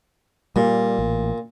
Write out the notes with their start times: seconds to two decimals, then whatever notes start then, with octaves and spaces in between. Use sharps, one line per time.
0.56 A#2 G3
0.99 A1